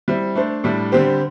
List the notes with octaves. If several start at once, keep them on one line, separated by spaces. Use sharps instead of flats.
G3 C4 E4
A3 D4 C5
A2 G3 D4
D3 G3 C4 G4 C5